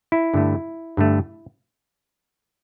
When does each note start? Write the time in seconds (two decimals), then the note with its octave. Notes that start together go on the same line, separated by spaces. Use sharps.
0.12 E4
0.34 G2 D3 A3
0.97 G2 D3 A3